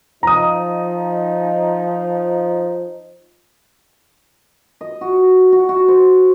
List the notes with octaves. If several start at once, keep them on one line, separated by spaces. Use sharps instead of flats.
F3 D#4 A#5 D#6
D#5
F#4
F#4
F#4
C5